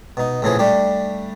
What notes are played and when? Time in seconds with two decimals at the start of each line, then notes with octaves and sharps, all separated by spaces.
0.17 B2 D#4
0.42 A#1 A2 C#3 E3 F3 G#4
0.59 G3 A3 D4 G4